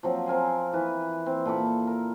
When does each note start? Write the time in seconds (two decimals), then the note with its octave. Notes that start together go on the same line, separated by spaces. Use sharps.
0.03 F3 F#3 C4
0.26 C4 A#4 G#5 C6
0.73 E3 B4
1.26 C4
1.45 A#2 A4 B5 D6
1.87 A#4